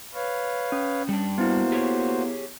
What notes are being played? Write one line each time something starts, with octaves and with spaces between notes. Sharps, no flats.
B4 C#5 F5
C#4
G3 D4
A#3 B3 E4 F#4 C5
G4 G#4 C#5